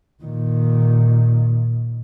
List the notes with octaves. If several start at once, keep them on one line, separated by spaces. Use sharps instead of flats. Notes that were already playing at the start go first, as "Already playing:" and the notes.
A#2 D#3